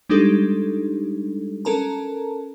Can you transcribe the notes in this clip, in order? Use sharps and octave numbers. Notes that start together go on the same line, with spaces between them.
G3 G#3 D4 D#4 G4 A4
C#4 A4 A#4 A5 A#5